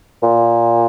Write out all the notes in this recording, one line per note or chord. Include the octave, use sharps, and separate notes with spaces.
A#2